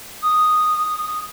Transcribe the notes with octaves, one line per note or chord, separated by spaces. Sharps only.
D#6